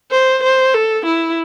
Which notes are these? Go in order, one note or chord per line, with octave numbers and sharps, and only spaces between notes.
C5
C5
A4
E4